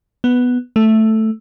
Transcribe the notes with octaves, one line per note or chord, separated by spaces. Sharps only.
B3
A3